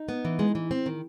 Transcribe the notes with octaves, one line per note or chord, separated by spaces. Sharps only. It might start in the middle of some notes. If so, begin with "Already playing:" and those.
Already playing: D#4
B3
E3
G#3
E3
C4
D#3